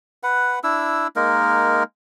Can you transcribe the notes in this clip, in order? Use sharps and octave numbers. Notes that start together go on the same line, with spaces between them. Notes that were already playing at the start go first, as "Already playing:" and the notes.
B4 F#5
D4 E4 E6
G#3 A#3 D#4 A#4